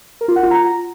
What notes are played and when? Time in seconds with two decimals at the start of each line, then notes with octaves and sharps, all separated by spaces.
0.21 A#4
0.28 F4
0.36 F#5
0.43 F4
0.51 A#5